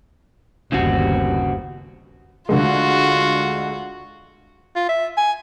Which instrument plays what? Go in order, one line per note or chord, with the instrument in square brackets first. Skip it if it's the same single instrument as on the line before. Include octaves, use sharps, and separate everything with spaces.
[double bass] G1 D#2 [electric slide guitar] C#3 C4 F#4
[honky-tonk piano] D2 D3 G#3 [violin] F4 F#4
[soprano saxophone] F4
E5
G#5